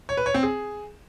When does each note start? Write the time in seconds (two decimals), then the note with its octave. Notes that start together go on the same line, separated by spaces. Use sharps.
0.09 C#5
0.17 B4
0.26 C#5
0.34 C4
0.43 G#4